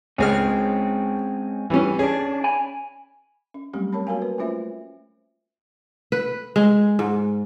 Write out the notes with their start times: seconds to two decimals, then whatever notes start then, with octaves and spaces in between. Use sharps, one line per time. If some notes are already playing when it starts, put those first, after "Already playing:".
0.18 C#2 G#3 C4 C#4 G#4 F6
1.70 E3 G3 C#4
1.99 C#4 D4 G#4
2.44 G#5 B5
3.54 C#4
3.74 F#3 G3 A3 C4 C#4 G4
3.93 A#4 C#5 A5 B5
4.07 A#3 F#4 A#4 C#5 F5 G#5
4.22 B4
4.38 A3 C#4 F4 C5 E5
6.12 B4
6.56 G#3
6.99 G#2